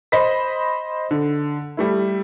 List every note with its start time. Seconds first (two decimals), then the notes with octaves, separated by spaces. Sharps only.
0.12 C5 D#5 B5 B6
1.11 D3
1.77 G3 A3 E4